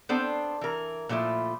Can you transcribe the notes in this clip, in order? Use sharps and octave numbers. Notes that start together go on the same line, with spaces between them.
B3 C4 D4 A4 C5
E3 A#4
A#2 F3 A3 E4